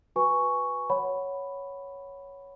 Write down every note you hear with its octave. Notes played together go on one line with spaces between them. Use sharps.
F#4 B4 G#5 C#6
C#5 F#5 B5